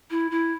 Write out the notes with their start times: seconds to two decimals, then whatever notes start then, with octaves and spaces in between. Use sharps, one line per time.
0.11 E4
0.31 E4